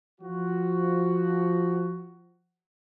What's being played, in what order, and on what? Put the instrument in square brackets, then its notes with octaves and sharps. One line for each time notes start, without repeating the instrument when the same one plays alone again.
[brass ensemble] F3 F#4